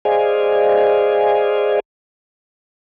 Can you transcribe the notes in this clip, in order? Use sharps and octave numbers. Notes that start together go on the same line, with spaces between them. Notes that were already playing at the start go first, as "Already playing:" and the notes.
G#4 C5 D5 D#5 F5 G#5